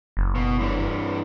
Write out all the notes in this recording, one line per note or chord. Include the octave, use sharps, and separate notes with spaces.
F#1
B2
G2 E3